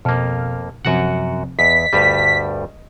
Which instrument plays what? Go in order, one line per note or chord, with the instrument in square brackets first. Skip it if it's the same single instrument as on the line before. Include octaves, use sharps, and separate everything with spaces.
[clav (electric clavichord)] F2 A#3 [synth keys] B2 A5 F6
[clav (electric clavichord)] F#2 F#4 F#5 [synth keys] C3 F3 C4
[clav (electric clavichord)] E2 [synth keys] D#5 [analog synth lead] B6
[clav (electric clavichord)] D2 G2 G3